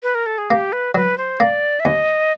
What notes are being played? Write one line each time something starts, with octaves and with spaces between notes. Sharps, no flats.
B4
A#4
A4
G#4
A#3 G4
B4
F#3 B4
C5
A#3 D5
E5
D#2 D#5